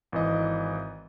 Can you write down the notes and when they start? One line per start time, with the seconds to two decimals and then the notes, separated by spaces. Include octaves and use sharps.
0.12 G#1 E3 D#5